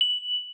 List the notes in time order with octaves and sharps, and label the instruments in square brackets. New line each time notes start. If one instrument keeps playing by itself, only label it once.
[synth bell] F#7